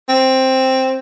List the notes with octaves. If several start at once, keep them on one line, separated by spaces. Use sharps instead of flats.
C4